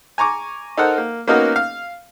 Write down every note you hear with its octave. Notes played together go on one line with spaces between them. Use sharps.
G#5 A#5 C#6 D6
D#4 A4 A#4 C5 F#5
A#3
A#3 B3 C#4 D#4 F#4 A#4
F5